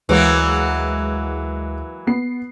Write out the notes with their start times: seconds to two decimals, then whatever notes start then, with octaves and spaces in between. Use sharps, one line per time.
0.09 D2 E3 F#3 G#3 A#3
2.07 B3 C7